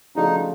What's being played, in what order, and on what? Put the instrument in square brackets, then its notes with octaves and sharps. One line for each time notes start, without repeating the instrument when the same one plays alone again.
[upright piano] C#3 F3 A3 D4 F#4 [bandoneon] D#4